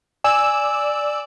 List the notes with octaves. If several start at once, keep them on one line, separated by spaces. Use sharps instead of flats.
D5 G#5 E6